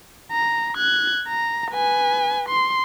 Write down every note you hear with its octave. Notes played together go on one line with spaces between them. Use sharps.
A#5
F#6 G#6
A#5
B4 G#5
C6